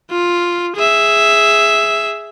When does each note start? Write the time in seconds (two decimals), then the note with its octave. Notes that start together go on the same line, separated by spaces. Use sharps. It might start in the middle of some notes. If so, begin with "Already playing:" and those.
0.11 F4
0.76 G#4 E5